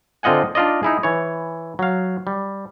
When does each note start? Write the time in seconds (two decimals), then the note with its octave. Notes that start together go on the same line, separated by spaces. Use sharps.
0.23 D3 C4 F4 D#5 F#5 G#5
0.55 D4 D#4 F4 D5 D#5
0.83 D#4 E4 G#4
1.03 E3 C#5
1.79 F#3 F5
2.27 G3